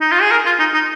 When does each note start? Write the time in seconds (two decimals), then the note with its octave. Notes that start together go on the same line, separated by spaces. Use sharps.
0.01 D#4
0.12 F4
0.22 G#4
0.31 A#4
0.46 F4
0.59 D#4
0.74 D#4